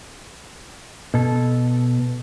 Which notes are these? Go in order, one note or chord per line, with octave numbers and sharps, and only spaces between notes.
B2 A4